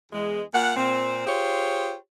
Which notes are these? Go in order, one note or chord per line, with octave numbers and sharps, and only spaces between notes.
E2 G#3
A#2 F#5
A#2 C4
F4 G4 G#4 C5 C#5